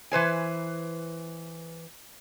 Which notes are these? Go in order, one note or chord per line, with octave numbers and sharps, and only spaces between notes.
E3 B4 C5 G#5